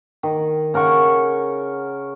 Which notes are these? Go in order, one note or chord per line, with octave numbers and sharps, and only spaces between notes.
D#3
C#3 A#4 F#5 C#6